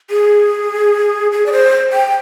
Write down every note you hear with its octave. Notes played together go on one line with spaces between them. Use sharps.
G#4
G#4
D5
C5
G5